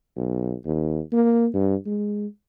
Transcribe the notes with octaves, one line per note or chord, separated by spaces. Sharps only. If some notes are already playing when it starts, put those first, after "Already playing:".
B1
D#2
A#3
G2
G#3